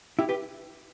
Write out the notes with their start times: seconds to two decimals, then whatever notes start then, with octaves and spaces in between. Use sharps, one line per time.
0.19 E4 G4
0.29 G4 B4